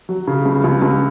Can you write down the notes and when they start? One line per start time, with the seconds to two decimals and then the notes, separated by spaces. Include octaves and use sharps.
0.09 F#3
0.27 C#3
0.45 C#2
0.64 C#2
0.82 C#2